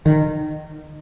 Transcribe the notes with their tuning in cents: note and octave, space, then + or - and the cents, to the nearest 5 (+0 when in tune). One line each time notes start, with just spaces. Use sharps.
D#3 -25